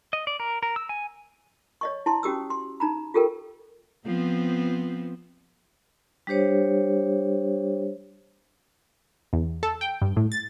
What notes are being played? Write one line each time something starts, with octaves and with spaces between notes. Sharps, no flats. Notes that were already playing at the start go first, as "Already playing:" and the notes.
D#5
D5
A#4
A#4
E6
G#5
C#5 D#5 C#6
E4 A5 C6
C#4 F#4 G4 D#6 E6
C6
D#4 A#5 B5
F4 G4 A4 A#4 G5
F3 B3 C4
G3 D4 G4 C5 C#5
E2
A4
G5
G2
A2
A6